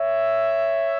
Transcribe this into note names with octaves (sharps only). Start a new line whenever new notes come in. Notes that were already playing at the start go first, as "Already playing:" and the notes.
Already playing: C#5 E5